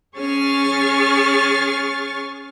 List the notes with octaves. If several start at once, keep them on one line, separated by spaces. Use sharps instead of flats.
C#4 G#4 C#6 F6 A6